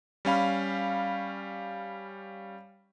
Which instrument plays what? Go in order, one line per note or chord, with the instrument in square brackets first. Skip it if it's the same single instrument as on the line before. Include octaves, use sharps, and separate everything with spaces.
[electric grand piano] G3 C#4 F5 B5